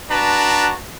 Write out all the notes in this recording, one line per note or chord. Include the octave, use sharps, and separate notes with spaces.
D4 F#4 B4 A5 A#5